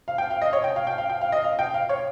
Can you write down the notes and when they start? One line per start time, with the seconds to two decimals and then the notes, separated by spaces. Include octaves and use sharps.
0.08 F5
0.18 G5
0.31 F5
0.42 D#5
0.53 C#5
0.64 G5
0.76 F5
0.87 G5
0.98 F5
1.10 G5
1.21 F5
1.32 D#5
1.44 F5
1.59 G5
1.74 F5
1.89 C#5